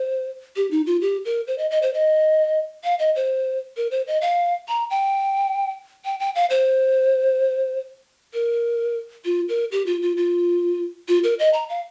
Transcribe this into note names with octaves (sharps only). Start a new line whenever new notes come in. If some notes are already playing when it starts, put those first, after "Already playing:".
Already playing: C5
G4
D#4
F4
G4
A#4
C5
D#5
D#5
C5
D#5
F5
D#5
C5
A#4
C5
D#5
F5
A#5
G5
G5
G5
F5
C5
A#4
F4
A#4
G4
F4
F4
F4
F4
A#4
D#5
A#5
F5